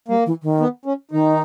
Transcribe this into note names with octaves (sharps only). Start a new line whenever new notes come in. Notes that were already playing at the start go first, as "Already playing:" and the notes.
G3 A#3
E3
D#3
B3
C#4
D#3 D#4